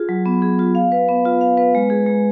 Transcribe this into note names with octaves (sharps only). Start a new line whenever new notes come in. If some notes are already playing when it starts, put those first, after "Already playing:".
Already playing: F4 G#4
F#3
B3
G#4
F4
F5
B4
B3
F4
F5
B4
G#3
G#4
G#3